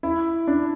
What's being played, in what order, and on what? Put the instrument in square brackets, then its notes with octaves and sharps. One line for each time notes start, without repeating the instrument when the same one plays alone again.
[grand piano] E4
D4